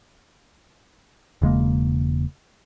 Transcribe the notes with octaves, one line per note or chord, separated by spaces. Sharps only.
E1 C#3 G#3 A#3